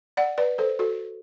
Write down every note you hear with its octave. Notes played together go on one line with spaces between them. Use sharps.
D5 F#5
B4 D5
A4 C5
F#4 A4